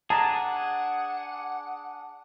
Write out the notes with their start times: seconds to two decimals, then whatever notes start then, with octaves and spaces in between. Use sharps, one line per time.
0.10 D4 G#4 F#5 A5 A#5